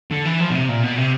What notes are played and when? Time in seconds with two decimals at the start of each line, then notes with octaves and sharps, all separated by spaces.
0.11 D3
0.25 E3
0.40 F3
0.50 B2
0.55 C3
0.69 A#2
0.84 B2
0.98 C3